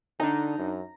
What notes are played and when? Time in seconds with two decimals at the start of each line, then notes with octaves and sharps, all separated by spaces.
0.20 D3 D4 D#4 A#5
0.58 F#2